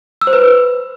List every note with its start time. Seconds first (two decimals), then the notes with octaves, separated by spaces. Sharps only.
0.21 E6
0.27 C5
0.33 B4